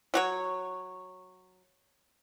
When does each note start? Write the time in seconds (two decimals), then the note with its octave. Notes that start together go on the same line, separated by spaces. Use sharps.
0.14 F#3 F#4 C#5